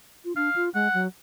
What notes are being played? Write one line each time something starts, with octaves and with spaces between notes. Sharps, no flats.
F4
D4 F5
F4
G#3 F#5
F#3